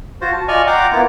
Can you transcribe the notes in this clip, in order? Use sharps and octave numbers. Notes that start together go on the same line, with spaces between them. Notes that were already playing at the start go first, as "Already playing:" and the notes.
F4 F#4 C5
A5
F4 D5 D#5 G#5 C#6 F6
F#5 G5 A#5 C6 D6
A#3 B3 E4 F4